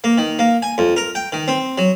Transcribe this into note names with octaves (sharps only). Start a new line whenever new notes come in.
A#3
D#3
A#3
G#5
F2
A#4
G5
D#3
C4
F#3